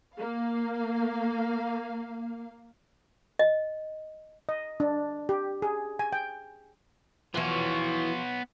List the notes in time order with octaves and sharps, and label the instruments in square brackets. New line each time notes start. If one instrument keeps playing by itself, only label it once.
[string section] A#3 F5
[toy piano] D#5
[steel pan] D#5
D4
G4
G#4
G#5
G5
[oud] E2 E3 [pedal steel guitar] F3 F4 F#4 [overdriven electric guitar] B3 C#5